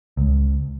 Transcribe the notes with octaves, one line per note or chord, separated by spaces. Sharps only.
C#2